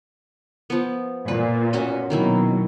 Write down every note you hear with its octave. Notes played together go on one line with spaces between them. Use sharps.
F3 B3
A#2 B4
C#4 F#4 D#5
B2 D#3 F#3 A#3 E4